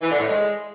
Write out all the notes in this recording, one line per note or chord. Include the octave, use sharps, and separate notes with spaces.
E3
D3
A2
G#3